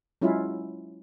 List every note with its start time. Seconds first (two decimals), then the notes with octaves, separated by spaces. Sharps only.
0.22 F#3 G#3 C#4 E4 F4